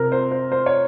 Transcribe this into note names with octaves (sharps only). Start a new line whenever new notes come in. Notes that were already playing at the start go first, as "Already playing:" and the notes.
Already playing: C3 A#4
C5
C5
C5
C#5